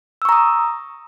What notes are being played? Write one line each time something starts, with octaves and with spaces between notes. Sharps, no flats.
A#5 C#6 D#6 E6